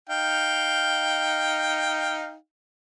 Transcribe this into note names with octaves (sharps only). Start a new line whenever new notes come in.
D#4 F5 G5